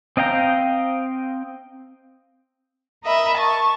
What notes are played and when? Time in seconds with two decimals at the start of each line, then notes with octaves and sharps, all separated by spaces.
0.17 C4 D#5 F5 G5 A#5
3.04 A#4 D#5 E5 B5
3.38 A5 C#6